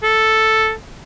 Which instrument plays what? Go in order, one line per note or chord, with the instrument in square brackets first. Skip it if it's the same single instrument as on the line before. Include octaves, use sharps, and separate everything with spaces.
[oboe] A4